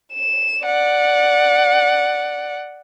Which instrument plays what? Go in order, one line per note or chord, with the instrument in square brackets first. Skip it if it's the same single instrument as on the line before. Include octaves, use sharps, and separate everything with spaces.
[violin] E7
D5 F#5